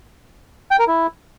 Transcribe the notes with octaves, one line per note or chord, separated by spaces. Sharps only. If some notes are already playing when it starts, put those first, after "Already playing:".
G5
A#4
E4